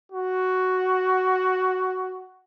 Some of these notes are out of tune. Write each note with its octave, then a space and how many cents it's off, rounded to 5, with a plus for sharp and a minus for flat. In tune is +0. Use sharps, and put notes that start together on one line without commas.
F#4 +5